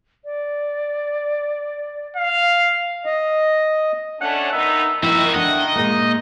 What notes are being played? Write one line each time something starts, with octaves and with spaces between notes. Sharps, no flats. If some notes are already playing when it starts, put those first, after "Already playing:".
D5
F5
D#5
A3 C#4 D4 F#5
D#3 B3 D#4 E5
F2 A#2 D#3 E4 F#4 E5
D3 D4 E4 D#5 F#5
A#2 G#3 A#3 D#4